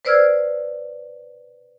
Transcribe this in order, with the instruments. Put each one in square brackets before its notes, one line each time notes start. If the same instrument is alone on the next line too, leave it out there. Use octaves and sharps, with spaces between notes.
[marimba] B4 C5 D5 E6 F6 G#6